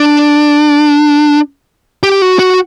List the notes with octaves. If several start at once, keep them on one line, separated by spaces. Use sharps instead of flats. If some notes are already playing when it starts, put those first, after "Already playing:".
Already playing: D4
G4
F#4
F#4